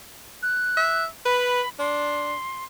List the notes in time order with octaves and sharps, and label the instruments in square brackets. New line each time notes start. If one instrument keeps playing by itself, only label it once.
[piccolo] F#6
[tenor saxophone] E5
[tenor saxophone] B4 [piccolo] B5
[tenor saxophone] D4 [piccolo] C6